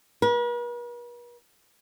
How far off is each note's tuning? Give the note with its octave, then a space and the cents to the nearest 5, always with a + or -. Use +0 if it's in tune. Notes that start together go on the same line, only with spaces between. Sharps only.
B4 -45